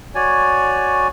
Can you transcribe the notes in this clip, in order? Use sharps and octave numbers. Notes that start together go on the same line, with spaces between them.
F#4 C#5 D5 G#5